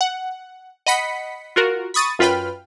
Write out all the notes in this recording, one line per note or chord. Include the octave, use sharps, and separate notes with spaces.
F#5
D#5 F#5 B5 B6 C#7
F4 F#4 A#4
B5 C#6 D#6 A6 D#7
F#2 F4 B4 G5 B5 F6